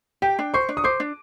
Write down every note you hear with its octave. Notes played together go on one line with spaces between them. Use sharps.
G4 G5
D4
C5 C#6
D4
D#6
C5 D6
D4